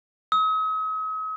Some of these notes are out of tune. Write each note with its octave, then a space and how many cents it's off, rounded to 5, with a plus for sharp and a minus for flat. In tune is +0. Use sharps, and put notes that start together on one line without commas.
D#6 +45